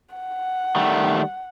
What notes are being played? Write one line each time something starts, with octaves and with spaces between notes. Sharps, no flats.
F#5
D#3 G3 A3